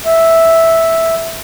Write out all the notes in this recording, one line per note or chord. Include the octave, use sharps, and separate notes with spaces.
E5